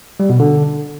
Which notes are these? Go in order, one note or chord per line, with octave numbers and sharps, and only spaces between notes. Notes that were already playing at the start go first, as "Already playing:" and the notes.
G3
B2
D3